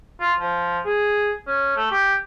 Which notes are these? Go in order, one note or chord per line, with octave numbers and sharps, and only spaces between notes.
F4
F3
G#4
C#4
A3
G4